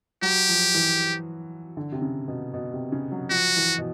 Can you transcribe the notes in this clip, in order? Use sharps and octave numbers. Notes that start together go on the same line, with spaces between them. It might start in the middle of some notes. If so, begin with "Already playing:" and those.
F#3 G4
F3
E3
D3
C3
C#3
B2
B2
C3
C#3
F#3
F3 F#4
E3
B2